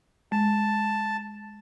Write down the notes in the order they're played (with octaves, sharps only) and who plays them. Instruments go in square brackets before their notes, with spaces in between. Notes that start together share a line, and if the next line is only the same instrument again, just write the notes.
[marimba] G#3 [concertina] A5